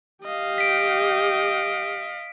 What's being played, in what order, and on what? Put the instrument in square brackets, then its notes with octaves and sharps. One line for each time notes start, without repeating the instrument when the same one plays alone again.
[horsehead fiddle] G4 [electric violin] D#5 F5
[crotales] B6 D7